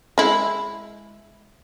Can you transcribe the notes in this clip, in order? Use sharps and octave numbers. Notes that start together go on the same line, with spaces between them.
G#3 E4